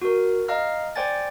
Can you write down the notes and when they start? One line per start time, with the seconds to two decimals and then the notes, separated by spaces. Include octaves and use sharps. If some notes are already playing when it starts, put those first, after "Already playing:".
0.01 F#4 A#4
0.48 D#5 F5 A#5 F6
0.96 C5 D5 G5 G#5 A6